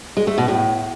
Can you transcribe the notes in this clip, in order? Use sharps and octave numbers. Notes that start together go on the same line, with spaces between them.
G#3
A3
B2
A2